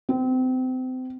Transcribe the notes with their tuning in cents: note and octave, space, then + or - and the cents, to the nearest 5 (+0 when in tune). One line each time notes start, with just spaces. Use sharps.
C4 -30